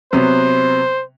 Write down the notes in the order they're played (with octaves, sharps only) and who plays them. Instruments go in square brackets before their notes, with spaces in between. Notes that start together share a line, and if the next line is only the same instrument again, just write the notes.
[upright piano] C3 F#3 B3 [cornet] C5